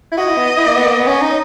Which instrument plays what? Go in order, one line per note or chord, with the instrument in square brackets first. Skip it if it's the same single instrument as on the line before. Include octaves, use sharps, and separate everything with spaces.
[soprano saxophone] E4
[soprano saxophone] F#4 [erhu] D#5
[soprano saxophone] E4
B3
E4
A#3
B3
A#3
B3
[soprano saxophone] C#4 [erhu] D#5
[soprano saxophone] D#4